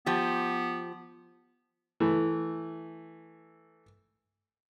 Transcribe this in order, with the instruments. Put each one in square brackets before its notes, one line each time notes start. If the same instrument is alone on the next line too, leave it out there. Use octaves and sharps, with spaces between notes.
[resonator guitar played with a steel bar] F3 G4 [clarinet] B3
[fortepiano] E3 A3